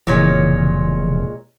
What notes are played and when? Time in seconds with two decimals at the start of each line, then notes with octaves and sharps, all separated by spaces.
0.07 F1 A#2 C#3 E3 G#3 C#4